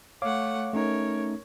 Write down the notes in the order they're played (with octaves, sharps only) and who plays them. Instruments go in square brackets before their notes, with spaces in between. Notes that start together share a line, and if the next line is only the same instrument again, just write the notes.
[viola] A3 F#5 [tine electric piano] C#5 F5 D6
[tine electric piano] A3 C#4 D#4 [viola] A#4 C#5